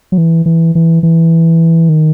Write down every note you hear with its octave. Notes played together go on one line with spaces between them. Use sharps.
F#3
E3
E3
E3
E3
D#3